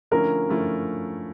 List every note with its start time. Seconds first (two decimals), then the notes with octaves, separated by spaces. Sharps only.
0.11 D3 F3 A3 C#4 E4 A#4
0.49 D3 F3 A3 C#4 E4